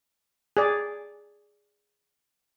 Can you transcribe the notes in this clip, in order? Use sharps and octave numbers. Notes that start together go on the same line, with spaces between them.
G#4 D5